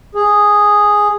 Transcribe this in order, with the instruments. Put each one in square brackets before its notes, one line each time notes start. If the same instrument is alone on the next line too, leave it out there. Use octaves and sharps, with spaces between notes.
[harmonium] G#4